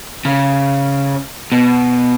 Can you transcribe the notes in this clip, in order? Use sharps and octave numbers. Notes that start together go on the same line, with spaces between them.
C#3
B2